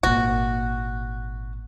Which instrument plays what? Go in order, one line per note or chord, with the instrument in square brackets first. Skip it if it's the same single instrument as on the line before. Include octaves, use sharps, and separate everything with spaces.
[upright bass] G#1 A#2 [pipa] F#4